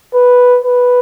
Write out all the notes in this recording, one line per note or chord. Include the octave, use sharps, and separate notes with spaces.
B4
B4